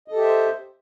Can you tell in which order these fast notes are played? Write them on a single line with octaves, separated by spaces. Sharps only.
D#5 A4 G4 E5 C5